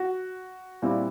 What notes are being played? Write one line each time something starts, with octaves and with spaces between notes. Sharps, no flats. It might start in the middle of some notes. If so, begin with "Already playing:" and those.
Already playing: F#4
A#2 G3 C4 E4